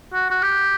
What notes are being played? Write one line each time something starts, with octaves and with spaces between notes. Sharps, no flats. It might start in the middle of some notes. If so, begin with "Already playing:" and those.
F#4
F#4
G4